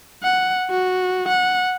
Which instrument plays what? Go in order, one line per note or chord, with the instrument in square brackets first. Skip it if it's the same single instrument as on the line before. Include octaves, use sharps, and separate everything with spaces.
[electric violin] F#5
F#4
F#5